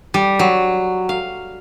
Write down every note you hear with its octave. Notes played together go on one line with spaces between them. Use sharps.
G3
F#3
F5